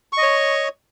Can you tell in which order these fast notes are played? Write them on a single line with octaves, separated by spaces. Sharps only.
C#6 D#5 C#5